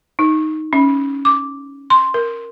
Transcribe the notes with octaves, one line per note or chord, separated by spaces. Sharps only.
D#4
C#4
D6
C6
A#4